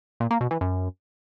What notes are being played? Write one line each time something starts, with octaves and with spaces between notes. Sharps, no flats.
A#2
A#3
B2
E3
F#2